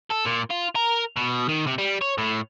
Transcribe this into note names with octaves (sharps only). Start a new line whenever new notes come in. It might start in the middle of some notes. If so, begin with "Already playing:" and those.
A4
A#2
F4
A#4
B2
D#3
C3
G3
C#5
A2